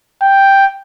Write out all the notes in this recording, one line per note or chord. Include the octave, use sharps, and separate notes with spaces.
G5